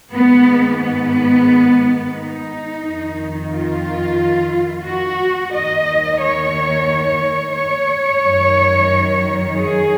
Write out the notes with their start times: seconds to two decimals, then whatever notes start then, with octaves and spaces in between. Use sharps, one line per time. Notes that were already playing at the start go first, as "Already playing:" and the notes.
0.14 G#2 D#3 B3
0.81 B3
2.16 D#4
2.83 F2 D#3
3.51 F4
4.86 F#4
5.53 D#2 D#3 D#5
6.20 C#5
7.55 C#5
8.22 F#2 D#3
9.57 G#4